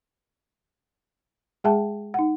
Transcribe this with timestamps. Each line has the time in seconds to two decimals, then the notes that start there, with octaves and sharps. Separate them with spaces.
1.64 G#3 G#4 E5 G5 A5
2.14 D#4 F#5